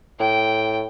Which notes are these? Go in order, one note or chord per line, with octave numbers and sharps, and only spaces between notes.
A2 G5